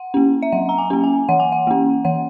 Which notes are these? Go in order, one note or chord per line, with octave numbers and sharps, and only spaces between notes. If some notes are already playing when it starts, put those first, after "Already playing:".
Already playing: F#5
A#3 C#4
E5
F#3 F#5
A#5
G#5
A#3 C#4
G#5
E3 F#5
G#5
F#5
A#3 C#4
E3 F#5